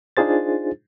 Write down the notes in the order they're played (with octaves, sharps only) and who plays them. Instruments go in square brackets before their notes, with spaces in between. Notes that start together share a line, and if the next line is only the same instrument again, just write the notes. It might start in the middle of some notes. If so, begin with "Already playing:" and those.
[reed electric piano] D4 D#4 F4 G#4 C5 A6